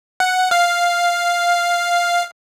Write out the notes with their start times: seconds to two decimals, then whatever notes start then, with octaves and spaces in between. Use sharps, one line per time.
0.20 F#5
0.51 F5